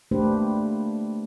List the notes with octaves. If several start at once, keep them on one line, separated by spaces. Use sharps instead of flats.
A3 A#3 D4 G4 B4 C5